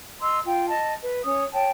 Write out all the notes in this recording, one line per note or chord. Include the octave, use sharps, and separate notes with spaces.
D#5 A#5 C6 E6
F4 G5
D#5 A5
B4
C#4 C#5 D#6
C#5 G5 A5